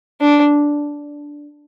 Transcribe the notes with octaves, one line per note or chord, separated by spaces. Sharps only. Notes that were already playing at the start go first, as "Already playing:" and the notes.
D4